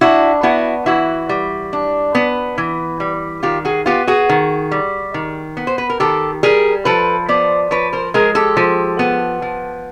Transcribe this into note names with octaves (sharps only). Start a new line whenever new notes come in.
D4 E4 F#4
B3 E4 F#4
E3 E4 F#4
G3
D4
B3
E3
G3
D#3 F4 G4
F#4 G#4
B3 F4 G4
F#4 G#4
D#3
G3
D#3
B3
C5
B4
A#4
D#3 G4 A4
G3 G#4 A#4
F3 A4 B4
B3 C5 D5
F3 B4 C#5
A#4 C5
G#3 G#4 A#4
G4 A4
F3
B3
F3